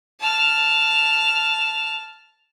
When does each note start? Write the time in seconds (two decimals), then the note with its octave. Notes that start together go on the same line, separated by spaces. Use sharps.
0.20 A5 F6